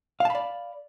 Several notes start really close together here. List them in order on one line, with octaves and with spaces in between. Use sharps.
F5 A5 B5 D5